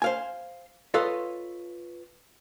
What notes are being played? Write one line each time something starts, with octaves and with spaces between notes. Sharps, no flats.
C5 F5 G#5
F4 A4 B4 C#5 D#5 F5